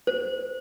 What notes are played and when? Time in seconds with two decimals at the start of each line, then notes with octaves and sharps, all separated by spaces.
0.07 C5